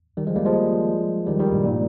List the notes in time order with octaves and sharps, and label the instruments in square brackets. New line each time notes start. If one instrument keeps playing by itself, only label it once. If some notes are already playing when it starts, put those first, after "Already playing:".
[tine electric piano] D#3 G3
F3 G#3
G3 A#3
F3 G#3
D#3 G3
D#3 G3
G2 A#2
A#2